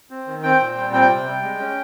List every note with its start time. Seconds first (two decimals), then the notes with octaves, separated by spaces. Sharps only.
0.10 C4
0.27 D#3
0.43 C4 G5
0.60 A#2
0.77 G3
0.93 C4 G5
1.10 C3
1.27 G3
1.43 G#3
1.60 C#4